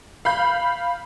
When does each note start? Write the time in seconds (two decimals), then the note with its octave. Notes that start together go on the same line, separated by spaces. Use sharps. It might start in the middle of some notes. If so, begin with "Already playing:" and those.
0.25 F5 B5 G6